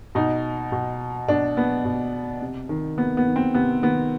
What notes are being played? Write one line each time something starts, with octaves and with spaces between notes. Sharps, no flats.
B2 D#4
B2
B2 D4
B3
B2
C3
D#3
C3 B3
B3
D#3
C4
C3 B3
D#3 B3